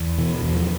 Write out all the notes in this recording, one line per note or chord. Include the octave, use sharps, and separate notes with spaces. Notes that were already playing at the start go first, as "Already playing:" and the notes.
Already playing: E2
B2 E3
E2
F3